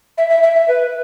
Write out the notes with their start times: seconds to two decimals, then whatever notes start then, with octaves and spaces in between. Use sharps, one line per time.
0.18 E5
0.30 E5
0.43 E5
0.56 E5
0.68 B4